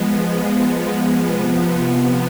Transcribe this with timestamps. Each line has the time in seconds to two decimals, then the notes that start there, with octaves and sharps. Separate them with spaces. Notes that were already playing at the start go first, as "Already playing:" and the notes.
Already playing: F3 G#3 B3
1.24 C3 F3 B3